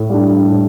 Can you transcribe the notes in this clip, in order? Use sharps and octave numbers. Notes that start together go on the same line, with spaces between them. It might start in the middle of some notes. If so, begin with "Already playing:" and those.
Already playing: A2
G3 D4
A2